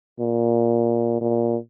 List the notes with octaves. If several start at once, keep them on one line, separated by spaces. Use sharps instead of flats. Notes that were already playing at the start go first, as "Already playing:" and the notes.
A#2
A#2